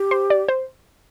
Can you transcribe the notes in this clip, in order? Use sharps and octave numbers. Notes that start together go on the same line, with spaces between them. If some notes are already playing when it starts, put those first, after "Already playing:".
Already playing: G4
C5
D5
C5